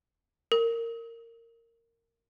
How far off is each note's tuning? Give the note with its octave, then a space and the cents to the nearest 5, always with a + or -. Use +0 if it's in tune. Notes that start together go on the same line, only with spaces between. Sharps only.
A#4 -15